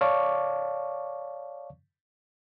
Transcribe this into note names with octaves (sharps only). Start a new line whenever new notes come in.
C#5 D5 F5 A5 C#6 D6